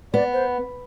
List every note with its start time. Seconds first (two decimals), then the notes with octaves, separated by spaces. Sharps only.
0.13 B3 D5
0.33 C5